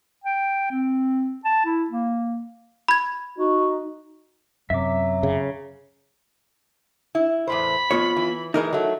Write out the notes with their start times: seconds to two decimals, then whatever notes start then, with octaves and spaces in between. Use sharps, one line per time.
0.24 G5
0.71 C4
1.45 A5
1.66 E4
1.90 A#3
2.88 B5 G#6
3.38 D#4 F#4
4.70 F#2 C3 F#3 E5 D6
5.23 C#3
7.15 E4
7.47 E2 A2 C5 B5
7.91 F2 B3 F4 C#5
8.17 E3
8.54 E3 G#3 D#4 A#4 D#5
8.73 F#3 A3